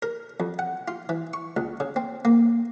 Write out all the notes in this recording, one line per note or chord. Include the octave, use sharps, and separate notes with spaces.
A#4
F2
F#5
F4
E3
C#6
C#2
C#3
C4
A#3